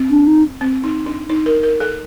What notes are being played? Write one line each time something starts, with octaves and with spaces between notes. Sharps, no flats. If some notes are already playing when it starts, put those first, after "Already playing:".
Already playing: C4
D4
D#4
C4
D#4
D4
D#4
A#4
A#4
A4